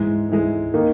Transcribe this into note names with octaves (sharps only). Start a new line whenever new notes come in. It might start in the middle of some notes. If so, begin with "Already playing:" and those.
Already playing: G#2 E3 G#3
G#2 E3 G#3
D#3 A#3 D#4